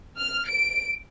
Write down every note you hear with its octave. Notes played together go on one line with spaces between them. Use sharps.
F6
D7